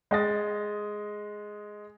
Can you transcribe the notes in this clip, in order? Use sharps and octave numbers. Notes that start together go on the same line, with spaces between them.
G#3 D#5 A6